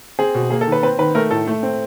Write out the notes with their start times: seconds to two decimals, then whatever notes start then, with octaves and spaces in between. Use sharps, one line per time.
0.19 C4 G#4
0.35 B2
0.50 A#3 G#4
0.61 A4
0.67 D#3
0.72 B4
0.83 C4 B4
0.98 D#3 B4
1.15 A3 A#4
1.31 A2 A4
1.47 A3
1.63 C4